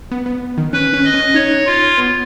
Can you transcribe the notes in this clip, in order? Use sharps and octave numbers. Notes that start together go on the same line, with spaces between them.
B3
B3
D#3
C#4 B4
C#4
D#5
C#4
D#4 C#5
F4
B3